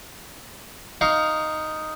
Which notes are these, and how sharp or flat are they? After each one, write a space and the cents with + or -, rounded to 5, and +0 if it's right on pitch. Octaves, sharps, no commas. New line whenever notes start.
D#4 +0 F5 +0 C#6 +25